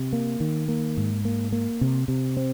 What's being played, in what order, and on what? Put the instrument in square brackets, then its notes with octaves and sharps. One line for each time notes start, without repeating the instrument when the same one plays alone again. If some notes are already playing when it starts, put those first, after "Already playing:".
Already playing: [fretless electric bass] C3
A#3
D#3
A#3
G#2
A#3
A#3
C3
C3
C4